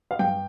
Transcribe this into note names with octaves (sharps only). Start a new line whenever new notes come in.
F5
G2 G5